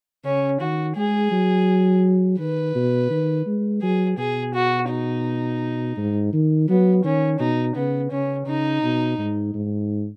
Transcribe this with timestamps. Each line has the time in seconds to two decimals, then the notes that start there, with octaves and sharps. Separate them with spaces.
0.25 C#3 C#4
0.60 D#3 F#4
0.96 G#3 G#4
1.32 F#3
2.39 D#3 B4
2.75 B2
3.10 D#3
3.47 G#3
3.82 F#3 G#4
4.18 B2 G#4
4.54 F#4
4.89 D#4
5.97 G#2
6.33 D#3
6.69 F#3 B3
7.04 D#3 C#4
7.39 B2 D#4
7.76 C#3 B3
8.11 C#3 C#4
8.47 C#3 D#4
8.83 B2
9.18 G#2
9.54 G#2